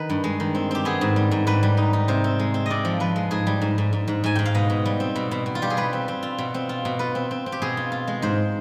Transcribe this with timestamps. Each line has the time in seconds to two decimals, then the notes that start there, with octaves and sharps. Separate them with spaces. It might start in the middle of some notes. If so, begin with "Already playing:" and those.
Already playing: D#3 B4
0.10 G2
0.24 G#3
0.40 D#3
0.55 C4
0.71 C4 G4
0.85 B3 G#4
1.01 G#2
1.16 G3
1.31 G#2
1.47 G#2 B4
1.63 G3
1.77 D#4
1.93 D#4
2.08 C3 C5
2.24 C4
2.39 G#3
2.54 C4
2.66 C3 D5 D#5
2.85 F3
3.00 F3 B4
3.16 G#3
3.31 G#2 G#4
3.47 G3
3.61 G#2
3.78 G#2
3.93 G#2
4.08 G#2
4.24 G#2 G#5
4.35 G#2 G5
4.45 F5
4.55 B2 D#5
4.70 B2
4.85 G3
5.00 C4
5.16 B2
5.31 B2
5.46 B2
5.55 F4
5.62 G3 G4
5.70 G#4
5.77 G3 B4
5.93 C4
6.08 C4
6.23 F4
6.38 B2
6.54 C4
6.69 F4
6.85 B2
6.99 F4 B4
7.15 C4
7.31 C4
7.46 C4
7.52 G4
7.62 B2 G#4
7.77 F4
7.92 F4
8.07 G#3
8.22 G#2 C5